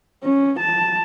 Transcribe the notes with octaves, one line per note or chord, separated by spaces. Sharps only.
C#4
A5